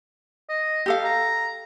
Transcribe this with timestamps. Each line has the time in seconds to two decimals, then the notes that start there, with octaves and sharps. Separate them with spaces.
0.49 D#5
0.86 G4 A4 F5
1.04 A#5